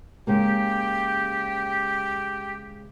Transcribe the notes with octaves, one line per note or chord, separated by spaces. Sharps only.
C#3 G#3 A#3 G4